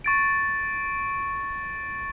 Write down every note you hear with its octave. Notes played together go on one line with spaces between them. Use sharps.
C#6 A6 D7